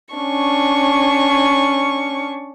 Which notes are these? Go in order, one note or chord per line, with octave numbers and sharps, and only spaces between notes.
C#4 D4 C#6